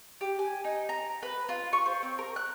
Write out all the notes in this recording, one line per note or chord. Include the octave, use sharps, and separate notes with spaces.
G4
G#5
D#4
A#5
B4
F4
C#6
C5
C4
A#4
F#6